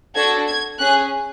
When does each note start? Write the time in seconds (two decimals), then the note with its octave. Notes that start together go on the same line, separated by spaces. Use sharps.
0.16 D4 F#4 A4 G#6
0.47 G#6
0.79 C#4 G#4 F#6